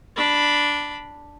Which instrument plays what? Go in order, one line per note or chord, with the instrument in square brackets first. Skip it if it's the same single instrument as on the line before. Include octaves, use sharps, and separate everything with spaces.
[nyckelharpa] D4 B5